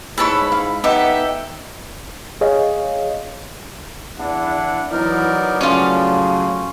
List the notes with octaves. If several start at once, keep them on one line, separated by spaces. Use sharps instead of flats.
G#2 E4 B4 C#5 A5 B5
F5
B3 D#4 G4 A4 E5 F#5
G#4 C#5 D#5 F5
E2 D4 E4 F#5
E3 F#3 B3 D#4 A#4 D5
A2 C#3 F3 F#3 C#4 F4